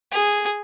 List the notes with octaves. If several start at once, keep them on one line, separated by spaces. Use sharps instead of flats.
G#4